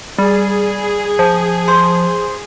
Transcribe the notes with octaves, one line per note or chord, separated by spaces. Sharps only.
G3 G#4
F3
C5